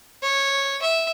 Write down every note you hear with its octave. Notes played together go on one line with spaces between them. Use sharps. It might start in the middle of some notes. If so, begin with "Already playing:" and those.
C#5
E5